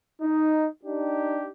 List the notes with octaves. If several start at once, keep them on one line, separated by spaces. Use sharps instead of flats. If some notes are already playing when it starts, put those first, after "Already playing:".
D#4
D4 D#4 G4